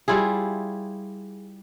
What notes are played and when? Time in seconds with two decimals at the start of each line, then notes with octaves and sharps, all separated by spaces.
0.08 G3 E4 F4 G#4